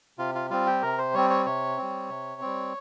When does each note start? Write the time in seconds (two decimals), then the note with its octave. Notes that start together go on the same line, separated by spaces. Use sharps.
0.18 C3 F4
0.35 F4
0.50 G3 C4 F4
0.67 G4
0.82 C3 A#4
0.98 C5
1.14 G3 C4 C#5
1.30 C#5
1.46 C3 C#5
1.78 G3 C4
2.09 C3
2.41 G3 C4